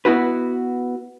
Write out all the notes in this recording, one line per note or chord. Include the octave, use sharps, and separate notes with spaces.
B3 E4 F#4 B4